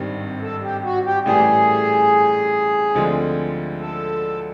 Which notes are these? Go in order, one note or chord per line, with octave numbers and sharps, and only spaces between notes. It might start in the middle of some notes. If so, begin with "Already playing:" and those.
Already playing: G#1 G2 D#3 G3 C4
A4
G4
F#4
G4
A1 A2 E3 G3 G#4
D2 D3 F3 G#3 C4
A4